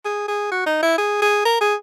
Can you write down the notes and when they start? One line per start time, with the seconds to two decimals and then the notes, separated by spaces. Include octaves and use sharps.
0.05 G#4
0.28 G#4
0.52 F#4
0.66 D#4
0.82 E4
0.98 G#4
1.22 G#4
1.45 A#4
1.61 G#4